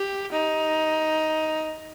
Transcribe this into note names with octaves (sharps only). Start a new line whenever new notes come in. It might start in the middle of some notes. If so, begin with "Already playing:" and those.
Already playing: G4
D#4